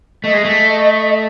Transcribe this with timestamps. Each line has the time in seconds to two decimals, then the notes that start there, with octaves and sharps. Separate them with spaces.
0.24 A3 D#5
0.34 G#3
0.45 A3